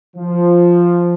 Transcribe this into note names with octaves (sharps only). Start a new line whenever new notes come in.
F3